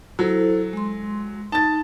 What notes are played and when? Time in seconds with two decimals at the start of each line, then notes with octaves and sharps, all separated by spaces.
0.19 F#3 E4 A4 C5
0.73 G#3 C6
1.52 D#4 A5 A6